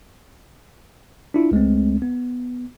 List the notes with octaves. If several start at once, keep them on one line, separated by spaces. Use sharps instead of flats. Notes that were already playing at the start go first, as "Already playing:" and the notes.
D4 E4 F4
C#2 G#3 A3 C4
B3